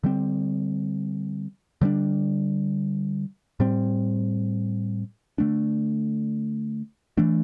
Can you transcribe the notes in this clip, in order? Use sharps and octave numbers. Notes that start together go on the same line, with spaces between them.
D3 G3 C4
D3 G3 D4
A2 G3 C4
D3 A3 D4
E3 A3 D4